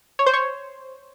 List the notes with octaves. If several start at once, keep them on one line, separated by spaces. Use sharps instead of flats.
C#5
C5
C#5